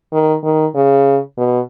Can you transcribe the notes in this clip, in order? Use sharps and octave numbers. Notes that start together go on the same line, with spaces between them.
D#3
D#3
C#3
B2